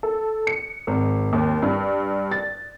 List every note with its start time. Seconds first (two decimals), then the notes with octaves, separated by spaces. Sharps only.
0.03 A4
0.47 C#7
0.87 G#1
1.33 D#2
1.62 G2
2.31 A6